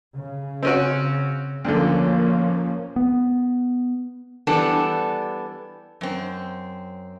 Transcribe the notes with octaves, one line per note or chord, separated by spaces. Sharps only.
C#3
C4 C#4 F#4
D2 D3 F3 A#3 C#4
B3
E3 G3 B3 D4 A4
F#2 C4